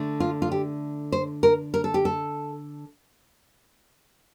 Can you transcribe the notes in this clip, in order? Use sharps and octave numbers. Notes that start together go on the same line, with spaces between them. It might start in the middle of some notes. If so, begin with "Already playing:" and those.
Already playing: D3 A3
F4
F4
G4
C5
A#4
A#4
A4
G4
A4